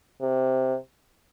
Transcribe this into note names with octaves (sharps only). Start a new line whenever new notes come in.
C3